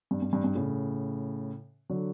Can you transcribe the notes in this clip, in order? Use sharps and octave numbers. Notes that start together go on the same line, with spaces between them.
G2
G2
G2
G2
A2 C#3
D3 F#3